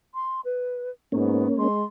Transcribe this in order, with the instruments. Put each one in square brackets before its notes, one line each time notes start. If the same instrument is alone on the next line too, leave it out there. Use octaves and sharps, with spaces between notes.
[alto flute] C6
B4
[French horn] G#2 [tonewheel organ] A#3 C#4 [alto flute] B3
[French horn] G#3 [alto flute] C6